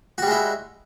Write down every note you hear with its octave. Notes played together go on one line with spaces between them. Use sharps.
G3 G#3 E4 F#4